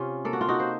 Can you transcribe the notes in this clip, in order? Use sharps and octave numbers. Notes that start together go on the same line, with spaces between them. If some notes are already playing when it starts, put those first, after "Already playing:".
Already playing: C3 C#4 F4
A#3 A4
F#4
F4
D#4 F#4
C5